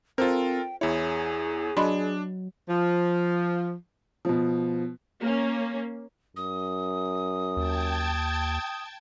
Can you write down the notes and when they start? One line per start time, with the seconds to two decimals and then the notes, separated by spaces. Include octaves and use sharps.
0.18 C4 F4 A4 A#4 C5 G5
0.81 E2 E4 G#4 C#5
1.77 F#3 D4 D#5 B5 C6
2.69 F3
4.25 B2 F3
5.20 A#3 C#4
6.36 F#2 D#6
7.57 D#2 G5 A5 G#6